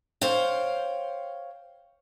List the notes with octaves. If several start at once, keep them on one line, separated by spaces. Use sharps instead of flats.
C5 C#5 F5 G5